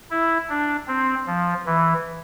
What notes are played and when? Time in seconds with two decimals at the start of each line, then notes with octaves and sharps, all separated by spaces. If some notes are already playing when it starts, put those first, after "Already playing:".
0.11 E4
0.49 D4
0.88 C4
1.27 F3
1.66 E3